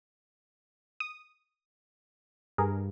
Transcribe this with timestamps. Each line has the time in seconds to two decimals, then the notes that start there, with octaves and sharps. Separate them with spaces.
1.00 D#6
2.58 G2 G#4 A#4